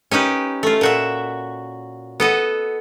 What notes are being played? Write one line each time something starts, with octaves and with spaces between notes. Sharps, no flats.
C#4 D#4 G4 B4
A3 F4
A#2 F#4 E5
B3 A4 D#5